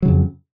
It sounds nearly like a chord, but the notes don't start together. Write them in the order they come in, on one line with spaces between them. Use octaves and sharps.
F#3 C#3 F2